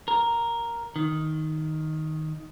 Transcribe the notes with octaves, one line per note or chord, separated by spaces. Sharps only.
A#4
D#3